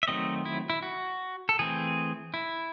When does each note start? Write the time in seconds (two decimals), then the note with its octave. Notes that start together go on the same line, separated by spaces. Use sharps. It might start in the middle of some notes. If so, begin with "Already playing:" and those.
0.03 E5
0.08 D#3 F#3 A3 C4 D#5
0.45 E4
0.70 E4
0.82 F#4
1.49 A4
1.59 E3 A3 C4 G#4
2.34 E4